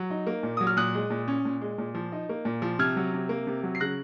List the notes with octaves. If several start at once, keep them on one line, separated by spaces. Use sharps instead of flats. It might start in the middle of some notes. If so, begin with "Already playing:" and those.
Already playing: F#3
D#4
A#3
A#2
F#3 D#6
F6
A#2 D#6 F#6
G#3
A#2
C#4
A#2
G#3
A#2
F3
D#4
A#3
A#2
F3
C3 F6 G#6
F#3
C3
A#3
C3
F#3
C7
C#3 F#6 A#6